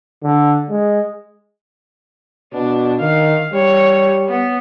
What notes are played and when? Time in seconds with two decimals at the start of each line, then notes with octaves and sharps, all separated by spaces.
0.23 D3
0.70 G#3
2.53 B2 D4
3.01 D#3 F5
3.53 G3 C#5
4.29 B3